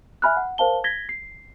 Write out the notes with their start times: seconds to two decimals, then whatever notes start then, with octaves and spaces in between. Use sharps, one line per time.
0.22 E5 G#5 B5 F6 F#6
0.37 F#5
0.58 A#4 C5 F5 A5 G7
0.84 G#6 A#6 B6 G7
1.09 C7